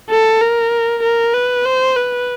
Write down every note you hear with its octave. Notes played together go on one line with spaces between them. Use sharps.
A4
A#4
A#4
B4
C5
B4